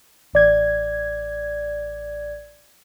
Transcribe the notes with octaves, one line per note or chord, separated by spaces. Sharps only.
A1 D5 G#6